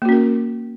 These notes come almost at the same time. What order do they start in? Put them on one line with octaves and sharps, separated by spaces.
A#3 F#4 C#4 A#4